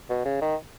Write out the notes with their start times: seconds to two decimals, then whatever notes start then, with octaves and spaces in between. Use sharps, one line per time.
0.10 B2
0.25 C#3
0.41 D#3